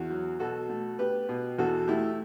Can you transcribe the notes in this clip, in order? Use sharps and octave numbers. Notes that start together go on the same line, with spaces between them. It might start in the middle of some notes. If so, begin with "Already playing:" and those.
Already playing: E2 F#4
F#3
B2 F#4 A4
A3
B3 G4 B4
B2
E2 F#4 A4
A3 E4 G4